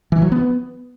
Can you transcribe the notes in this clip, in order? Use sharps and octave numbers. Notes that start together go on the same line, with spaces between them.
E3
F#3
B3